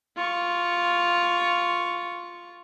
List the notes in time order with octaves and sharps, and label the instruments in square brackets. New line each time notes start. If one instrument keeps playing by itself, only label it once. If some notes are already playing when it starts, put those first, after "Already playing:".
[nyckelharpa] F4 C#6